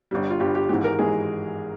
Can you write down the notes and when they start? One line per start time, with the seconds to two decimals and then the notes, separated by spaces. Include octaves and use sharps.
0.11 G1 G2 G3
0.30 F4
0.40 G1 G2 G3 G4
0.55 G4
0.69 G#1 G#2 E3 G#3 G4
0.84 A#4
0.98 G#1 G#2 E3 G#3 G#4